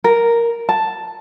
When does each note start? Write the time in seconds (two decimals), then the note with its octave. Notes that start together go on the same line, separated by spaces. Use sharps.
0.04 A#4
0.69 A5